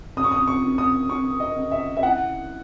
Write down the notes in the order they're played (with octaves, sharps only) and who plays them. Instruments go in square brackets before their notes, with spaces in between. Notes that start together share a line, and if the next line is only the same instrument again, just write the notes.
[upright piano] C#3 D#6
C#6
D#6
C#6
C#4
D#6
C#4 C#6
D#5
C#3
E5
E5
E4 F#5